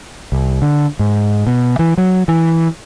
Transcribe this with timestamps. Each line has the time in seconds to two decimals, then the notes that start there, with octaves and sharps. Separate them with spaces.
0.32 C2
0.62 D3
0.99 G#2
1.47 B2
1.79 E3
1.98 F#3
2.28 E3